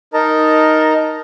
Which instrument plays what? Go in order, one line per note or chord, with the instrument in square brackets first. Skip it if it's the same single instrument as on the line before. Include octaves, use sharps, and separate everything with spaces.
[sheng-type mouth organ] D#4 A#4 D#5 A5 A#5